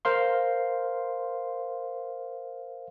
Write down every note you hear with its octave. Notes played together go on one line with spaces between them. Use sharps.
A#4 C5 F5 C6